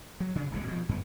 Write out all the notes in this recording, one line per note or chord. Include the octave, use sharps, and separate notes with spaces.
F#3
C#3 D4
D#1 C2 B2 G#3
B2 F3
F#2 A3 B3